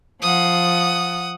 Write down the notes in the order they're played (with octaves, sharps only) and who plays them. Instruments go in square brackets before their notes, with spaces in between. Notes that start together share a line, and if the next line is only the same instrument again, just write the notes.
[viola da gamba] F3 [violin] F#5 D#6